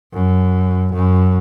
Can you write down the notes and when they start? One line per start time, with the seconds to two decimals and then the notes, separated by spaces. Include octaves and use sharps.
0.14 F#2
0.93 F#2